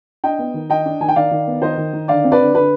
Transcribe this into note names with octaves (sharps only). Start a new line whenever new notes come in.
D4 D#5 G5
B3
D#3
D#3 D#5 G5
D4
D#3 G#5
G5
D#3 D5 F5
D#3
B3
D#3 C5 D#5
D#3
D#3
D3 D5 F5
C4
B4 D5
D3
D3 B4